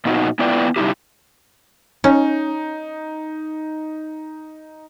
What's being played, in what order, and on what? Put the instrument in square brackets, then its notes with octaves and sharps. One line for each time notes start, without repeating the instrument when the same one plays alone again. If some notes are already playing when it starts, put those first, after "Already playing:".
[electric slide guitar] A#2 B3 D#4 F#4
B3 E4 F4 B4 D5 G5
C3 G3 G#3 D#4 E4 G4
[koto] C#4 [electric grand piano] D#4